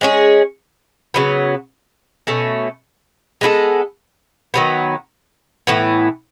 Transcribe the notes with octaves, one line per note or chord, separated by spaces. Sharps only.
G#3 C#4 G#4
C#3 F#3 B3
B2 A3 C#4
G#3 B3 E4 A4
D#3 F#3 B3
A2 E3 B3